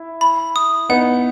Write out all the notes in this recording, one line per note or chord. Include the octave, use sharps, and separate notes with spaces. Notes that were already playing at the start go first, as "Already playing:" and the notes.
Already playing: E4
B5
D#6
B3 D#4 F#5